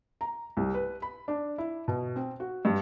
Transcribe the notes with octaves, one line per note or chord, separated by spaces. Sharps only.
A#5
C2
B4
B5
D4
E4
B2
C4
F#4
G2